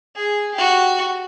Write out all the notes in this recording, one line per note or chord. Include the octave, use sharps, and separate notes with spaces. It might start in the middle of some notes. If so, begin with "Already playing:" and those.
G#4
F#4 G4